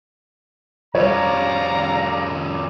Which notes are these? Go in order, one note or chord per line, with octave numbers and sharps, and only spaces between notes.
F2 G3 C#5 D5 F5 A#5